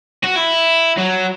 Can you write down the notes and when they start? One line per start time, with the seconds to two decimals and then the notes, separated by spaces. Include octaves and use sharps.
0.24 F#4
0.36 E4
0.98 F#3